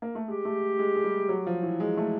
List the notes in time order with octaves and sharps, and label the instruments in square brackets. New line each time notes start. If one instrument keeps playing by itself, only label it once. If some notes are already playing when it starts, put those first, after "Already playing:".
[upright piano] A#3
A3
[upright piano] G#3 [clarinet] G4
[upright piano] A3
G#3
G#3
G3
F#3
F3
E3
G#3
A3